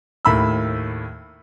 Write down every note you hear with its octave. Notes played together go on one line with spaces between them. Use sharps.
D#2 A2 B5 E6